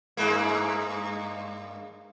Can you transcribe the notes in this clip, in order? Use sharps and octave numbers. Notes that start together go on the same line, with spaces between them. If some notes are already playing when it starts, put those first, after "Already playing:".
G2 G#3 A#3